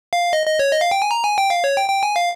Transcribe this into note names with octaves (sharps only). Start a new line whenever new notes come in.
F5
D#5
D#5
C#5
D#5
F5
G5
G#5
A#5
G#5
G5
F5
C#5
G5
G5
G#5
F5